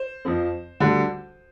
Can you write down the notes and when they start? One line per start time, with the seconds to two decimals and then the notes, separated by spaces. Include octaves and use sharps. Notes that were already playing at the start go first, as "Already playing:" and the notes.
Already playing: C5
0.25 F2 F3 C4
0.80 D2 D3 G3